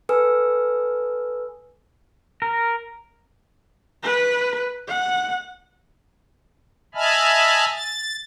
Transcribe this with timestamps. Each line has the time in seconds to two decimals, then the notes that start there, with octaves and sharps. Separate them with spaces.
0.09 A4 B4 G#5 E6
2.42 A#4
4.03 B4
4.88 F#5
6.95 D#5 E5 G#5 A5 B5 F6
7.75 A6